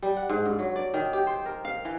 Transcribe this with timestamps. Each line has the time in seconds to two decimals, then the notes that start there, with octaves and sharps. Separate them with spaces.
0.02 G3
0.17 F#5
0.29 G#2
0.45 G2
0.59 F#3
0.76 D5
0.94 D#3
1.13 G4
1.27 C5
1.46 A#4
1.65 F5
1.85 E3